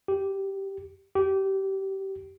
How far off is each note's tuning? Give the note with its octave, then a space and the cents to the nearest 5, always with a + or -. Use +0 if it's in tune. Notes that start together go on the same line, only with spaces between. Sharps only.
G4 -5
G4 -20